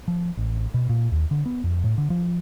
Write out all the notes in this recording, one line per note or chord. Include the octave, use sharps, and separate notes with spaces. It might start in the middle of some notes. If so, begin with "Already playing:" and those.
F3
A1
B2
A#2
D#2
D3
B3
F2
A2
D3
F3